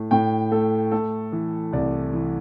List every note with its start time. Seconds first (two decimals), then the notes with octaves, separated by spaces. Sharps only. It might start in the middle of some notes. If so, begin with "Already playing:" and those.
Already playing: A2 A3
0.11 A2 G5
0.52 A3 A4
0.92 A3 A4
1.32 E3
1.73 C2 D5
2.13 E3